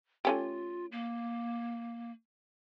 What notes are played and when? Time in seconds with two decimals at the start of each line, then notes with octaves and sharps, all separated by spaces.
0.25 A3 C#4 F4 G4
0.92 A#3